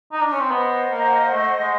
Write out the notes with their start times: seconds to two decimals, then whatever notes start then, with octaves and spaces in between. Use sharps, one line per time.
0.12 D#4
0.22 D4
0.32 C#4
0.40 C4
0.49 B3 C5 D#5 F#5
0.92 A#3
1.32 A3
1.61 G#3